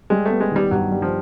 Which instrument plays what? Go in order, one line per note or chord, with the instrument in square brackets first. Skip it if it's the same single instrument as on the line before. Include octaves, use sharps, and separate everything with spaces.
[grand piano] G3 [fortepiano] G#3
[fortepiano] A3 [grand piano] B3
[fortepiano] G#3
[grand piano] D#3 [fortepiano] G3
[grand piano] G2 [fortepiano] F#3
[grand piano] G3
[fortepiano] F3